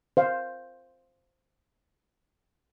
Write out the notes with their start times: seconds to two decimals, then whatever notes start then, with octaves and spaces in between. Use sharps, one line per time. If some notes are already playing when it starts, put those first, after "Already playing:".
0.17 C5 F5